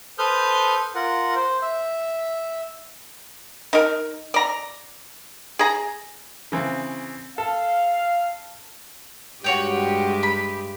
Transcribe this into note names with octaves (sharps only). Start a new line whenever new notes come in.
A4 B4 C5 D#6 F6 G6
F4 A#4 F#5
C5
E5
D#4 A#4
D5 A#5
G#4 A#5
C#3 E3 C4
A4 F5
G2 G#3 F#4 G4 C#5 G5
B5